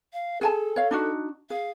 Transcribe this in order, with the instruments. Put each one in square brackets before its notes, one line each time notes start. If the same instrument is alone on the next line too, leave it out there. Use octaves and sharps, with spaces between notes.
[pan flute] F5
[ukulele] G#4 G#5 A5 [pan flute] A4
[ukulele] C#5 F5
D4 D#4 F#4
[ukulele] G#4 [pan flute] F5